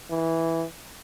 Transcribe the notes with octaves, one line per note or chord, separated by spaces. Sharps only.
E3